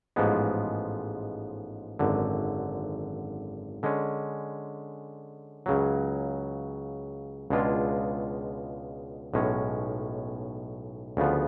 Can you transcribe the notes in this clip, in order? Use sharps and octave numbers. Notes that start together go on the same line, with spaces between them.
A1 G#2 F3 G#3 B3
G#1 F#2 D3
D3 G#3 C#4
C#2 C#3 F#3
C#2 B2 G#3 D4 F4
B1 A2 G#3 C#4
D2 C#3 F3 B3